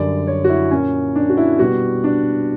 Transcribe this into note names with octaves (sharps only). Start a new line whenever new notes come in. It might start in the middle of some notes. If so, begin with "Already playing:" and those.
Already playing: F#2 D3 G3 D5
C#5
F#4
E4
A#2 A#3 C#4
D4
F#4
E4
B2 G3 B3 F#4
D4